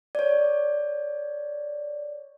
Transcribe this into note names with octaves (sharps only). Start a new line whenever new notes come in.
C#5 D5